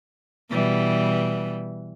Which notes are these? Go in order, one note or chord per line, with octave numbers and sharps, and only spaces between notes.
B2 E3 G3